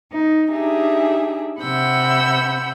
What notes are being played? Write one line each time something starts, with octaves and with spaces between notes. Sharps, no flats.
D#4
D4 D#4 G4 G#4 E5
C3 F#5 B5 E6 G6